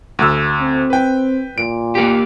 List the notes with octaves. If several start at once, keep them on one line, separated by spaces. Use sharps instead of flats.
D2 E6
C4
B4 G5
A#2 D7
A#3 G4